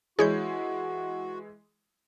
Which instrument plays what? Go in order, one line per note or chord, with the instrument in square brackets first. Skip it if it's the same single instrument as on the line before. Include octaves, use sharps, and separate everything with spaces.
[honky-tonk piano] E3 G#3 E4 [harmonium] F#4 [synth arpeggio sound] G#4 C#5 G6